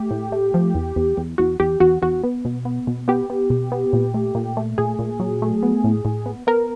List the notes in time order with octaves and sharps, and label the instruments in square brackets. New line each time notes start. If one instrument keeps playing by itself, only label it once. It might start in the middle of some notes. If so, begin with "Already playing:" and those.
Already playing: [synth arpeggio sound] A3 G4
A2
A3
F3
E2
E2
E2
E2 F#4
E2 G4
E2 F#4
E2 F#4
B3
B2
B3
B2
B3 G4
B3
B2
B3
A#2
A3
A#2
A3
A#2 G#4
A#2
F#3
A3
B3
A2
A2
B3
B3 A#4